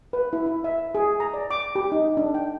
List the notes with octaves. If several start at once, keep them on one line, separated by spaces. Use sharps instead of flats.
B4
E4
E4
E5
G#4
A#5
D5
D6
G4
D#4
D4
G5